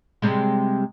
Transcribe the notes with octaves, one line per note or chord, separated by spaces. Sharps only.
C3 G3 G#3